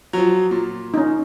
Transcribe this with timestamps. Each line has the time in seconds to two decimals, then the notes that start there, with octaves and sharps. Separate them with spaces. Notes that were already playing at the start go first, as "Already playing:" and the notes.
0.13 F3 F#3
0.51 A#2
0.94 C#4 D#4